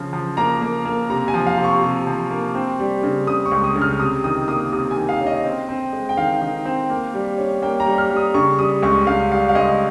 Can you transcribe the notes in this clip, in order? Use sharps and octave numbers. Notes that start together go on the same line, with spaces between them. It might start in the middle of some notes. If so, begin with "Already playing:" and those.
Already playing: C#3 F3
F3
A#3 A#5
A#3
A#3
C3 A#5
G#5
F3
F5
C3
C#6
C3
F3
A#3
C4
G3
C#3
C#3 D#6
C#6
C#2
D#6
C#3
F6
C3 D#6
D#3 D#6
A#3 D#6
C3 D#6
G#5
D#3
F5
C#4
D#5
C4
C4
G#3
G5
D#3 F5
D#3
C4
A#3
G3
C#4
A#3 G5
A#5
G3
F6
G3
D#6
C#3 C#6
G3 D#6
C#2 C#6
C#2 F5
G3 F5
F5
C#2 D#5